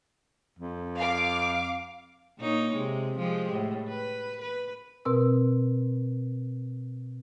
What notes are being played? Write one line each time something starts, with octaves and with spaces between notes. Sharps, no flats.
F2
F5 D6
A#2 D#4 C#5
C3 G#3
F3 G#3 G4
A2
B4
B4
B2 C4 A#4 E6